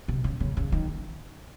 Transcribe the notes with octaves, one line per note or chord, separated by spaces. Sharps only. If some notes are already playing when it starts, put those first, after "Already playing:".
C3
C#3
C#3
C#3
D#3